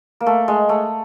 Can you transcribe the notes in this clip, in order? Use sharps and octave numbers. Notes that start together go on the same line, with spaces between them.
A#3
A3
G#3
A3